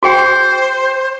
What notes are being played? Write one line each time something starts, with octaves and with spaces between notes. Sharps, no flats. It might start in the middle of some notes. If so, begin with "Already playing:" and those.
F#4 G#4 C5 G5